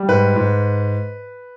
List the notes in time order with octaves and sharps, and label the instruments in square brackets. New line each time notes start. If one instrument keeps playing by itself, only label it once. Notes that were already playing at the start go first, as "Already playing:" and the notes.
Already playing: [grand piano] G3
G#2 B4
G#2